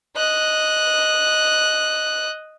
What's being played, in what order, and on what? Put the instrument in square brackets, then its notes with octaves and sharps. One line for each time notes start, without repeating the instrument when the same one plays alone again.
[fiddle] D#5 F#6